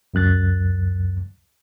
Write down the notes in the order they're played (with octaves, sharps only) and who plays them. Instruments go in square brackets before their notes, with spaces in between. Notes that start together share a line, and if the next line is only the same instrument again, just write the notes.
[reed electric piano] C#2 F#2 F#6 A6